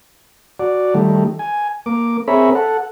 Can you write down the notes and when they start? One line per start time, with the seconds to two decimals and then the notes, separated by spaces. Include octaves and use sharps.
0.59 F#4 D5
0.94 D#3 G3 A3
1.39 G#5
1.86 A#3 D6
2.28 C4 G#4 A#4 C#5 E5 B5
2.55 A4 F#5